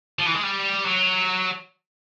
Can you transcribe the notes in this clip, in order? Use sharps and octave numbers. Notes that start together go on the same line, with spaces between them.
F3
E3
G#3
G3
F#3